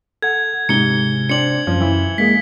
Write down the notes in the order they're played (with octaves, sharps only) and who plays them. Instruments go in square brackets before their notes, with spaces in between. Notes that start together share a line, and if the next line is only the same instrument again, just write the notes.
[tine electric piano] A4 F#5 [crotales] G#6
[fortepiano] G#2 [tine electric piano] C3 [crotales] C#7 G7
[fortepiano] C4 D4 [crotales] C#7 F#7
[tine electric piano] F#2 [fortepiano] F3
[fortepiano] E3 E4
[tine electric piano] G#3 A#3 G#4 [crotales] B6